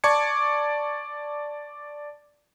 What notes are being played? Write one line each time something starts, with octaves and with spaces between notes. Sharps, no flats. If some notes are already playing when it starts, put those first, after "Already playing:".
D5 A5 C#6 D6 G#6 C#7